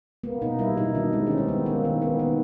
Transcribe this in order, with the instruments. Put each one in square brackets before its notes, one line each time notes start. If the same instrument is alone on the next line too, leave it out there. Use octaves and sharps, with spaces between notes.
[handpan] A#3 B3
B2 D#4
G3 E4
B2 D#4
D#3 D4
G#3 C4
D#3 C#4
C4
D#3 B3
D#3 A#3
D#3
D#3 B3
D#3 B3